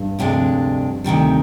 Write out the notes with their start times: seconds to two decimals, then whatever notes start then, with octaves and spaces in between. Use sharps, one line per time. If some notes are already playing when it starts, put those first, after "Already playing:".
Already playing: G2
0.19 D2 C3 F3 G#3 D4
1.04 D2 C3 D#3 G3